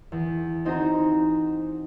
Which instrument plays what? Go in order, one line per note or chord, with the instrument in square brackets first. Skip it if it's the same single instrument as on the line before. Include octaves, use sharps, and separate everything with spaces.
[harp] E2
C4 D#4 F#4 G#4 C5 A#5